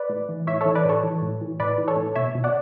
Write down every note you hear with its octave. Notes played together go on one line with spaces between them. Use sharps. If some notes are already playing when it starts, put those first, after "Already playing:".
Already playing: B4 D5
A2
E3
A2 C#5 E5
E3 A4 C#5
B4 D5
A2 A4 C#5
E3
A2
E3
A2 B4 D5
E3
A4 C#5
A2
B2 C#5 E5
B2
D5 F#5